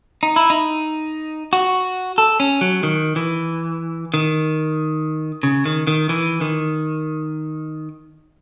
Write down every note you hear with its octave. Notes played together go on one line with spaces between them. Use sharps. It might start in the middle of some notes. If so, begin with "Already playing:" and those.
D#4
E4
D#4
F#4
A4
C#4
F#3
D#3
E3
D#3
C#3
D#3
D#3
E3
D#3